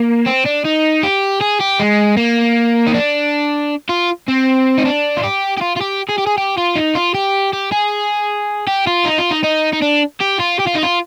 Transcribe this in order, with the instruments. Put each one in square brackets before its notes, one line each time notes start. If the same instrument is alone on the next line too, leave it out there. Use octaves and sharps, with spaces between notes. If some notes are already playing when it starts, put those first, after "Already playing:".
Already playing: [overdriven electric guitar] A#3
C4
D4
D#4
G4
G#4
G4
G#3
A#3
D#4
D4
F4
C4
D#4
D4
F4
G4
G4
F4
F4
G4
G#4
G4
G#4
G4
F4
D#4
F4
G4
G4
G#4
G4
F4
D#4
F4
D#4
D#4
D#4
D4
G4
F4
G4
F4
D#4
F4